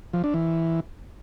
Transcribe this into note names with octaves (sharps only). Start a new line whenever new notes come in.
F3
D4
E3